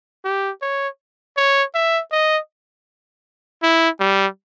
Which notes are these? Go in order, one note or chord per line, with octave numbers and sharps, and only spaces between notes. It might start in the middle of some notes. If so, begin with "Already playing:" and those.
G4
C#5
C#5
E5
D#5
E4
G3